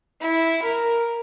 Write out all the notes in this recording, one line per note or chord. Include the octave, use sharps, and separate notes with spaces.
E4
A#4